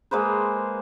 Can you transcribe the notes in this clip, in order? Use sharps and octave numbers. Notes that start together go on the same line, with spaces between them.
G#3 A#3 B4 C5